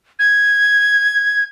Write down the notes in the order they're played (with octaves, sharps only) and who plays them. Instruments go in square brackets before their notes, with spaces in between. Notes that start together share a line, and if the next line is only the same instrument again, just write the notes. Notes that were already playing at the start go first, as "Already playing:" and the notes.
[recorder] G#6